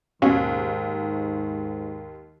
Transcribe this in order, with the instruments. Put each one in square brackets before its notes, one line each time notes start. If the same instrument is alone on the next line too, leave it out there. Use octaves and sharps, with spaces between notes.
[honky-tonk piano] D#2 [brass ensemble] G#2 [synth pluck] B2 C#4 F#4 [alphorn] D#3